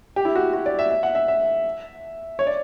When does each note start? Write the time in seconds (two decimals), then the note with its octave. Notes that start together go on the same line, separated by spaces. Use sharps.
0.16 G4
0.25 E4
0.36 F#4
0.53 F#4
0.66 D5
0.79 E5
0.90 E5
1.03 F#5
1.15 E5
1.28 E5
2.39 C#5
2.47 D5